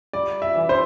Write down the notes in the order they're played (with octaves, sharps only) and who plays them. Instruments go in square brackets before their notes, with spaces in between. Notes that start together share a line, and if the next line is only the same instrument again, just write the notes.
[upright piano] G3 D5
E5
E3
C5